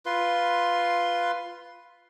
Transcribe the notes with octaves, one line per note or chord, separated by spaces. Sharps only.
F4 B4 C6